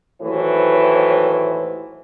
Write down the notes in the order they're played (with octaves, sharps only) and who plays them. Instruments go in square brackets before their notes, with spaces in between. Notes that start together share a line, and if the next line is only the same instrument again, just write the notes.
[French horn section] D#2 A2 E3 F#3 B4 C5